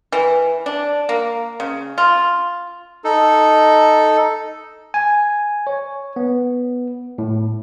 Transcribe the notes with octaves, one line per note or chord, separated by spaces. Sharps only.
E3
D4
A#3
C#3
F4
D#4 A4
G#5
C#5
B3
A2